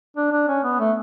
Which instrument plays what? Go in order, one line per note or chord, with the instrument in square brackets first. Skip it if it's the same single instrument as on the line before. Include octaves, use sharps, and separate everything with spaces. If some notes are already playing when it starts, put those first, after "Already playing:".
[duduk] D4
D4
C#4
B3
A3